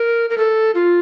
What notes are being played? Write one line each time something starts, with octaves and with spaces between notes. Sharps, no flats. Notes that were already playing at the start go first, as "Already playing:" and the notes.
Already playing: A#4
A#4
A4
F4